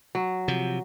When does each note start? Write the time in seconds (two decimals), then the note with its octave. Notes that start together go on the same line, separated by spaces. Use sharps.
0.15 F#3
0.48 C3 F3